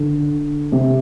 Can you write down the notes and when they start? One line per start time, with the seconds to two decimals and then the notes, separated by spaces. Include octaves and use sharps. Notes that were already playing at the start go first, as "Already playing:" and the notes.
Already playing: D3
0.72 C3